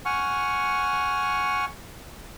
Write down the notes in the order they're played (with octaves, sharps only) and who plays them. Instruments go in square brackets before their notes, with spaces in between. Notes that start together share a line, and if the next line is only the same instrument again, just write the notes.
[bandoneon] F#5 G#5 C#6 F6